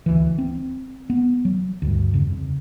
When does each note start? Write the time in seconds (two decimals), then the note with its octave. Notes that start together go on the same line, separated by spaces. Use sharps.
0.06 D2 E3
0.38 C4
1.10 B3
1.45 F#3
1.82 D2 G2
2.14 F2 C#3